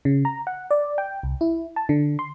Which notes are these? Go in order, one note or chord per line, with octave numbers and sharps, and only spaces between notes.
C#3
A#5
F#5
D5
G5
C2
E4
A5
D3
C6